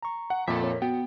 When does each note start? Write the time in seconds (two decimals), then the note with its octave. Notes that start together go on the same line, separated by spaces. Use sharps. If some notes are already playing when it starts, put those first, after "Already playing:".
0.03 A#5 C#6
0.30 F#5
0.48 F2 A#2 A4 E5
0.63 C4 A#4 C#5
0.82 B3 F#4 G5